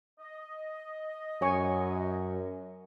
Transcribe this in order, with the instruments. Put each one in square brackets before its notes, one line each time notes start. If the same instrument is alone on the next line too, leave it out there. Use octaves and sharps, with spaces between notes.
[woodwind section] D#5
[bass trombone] F#2 [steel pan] C#5 G#5 C#6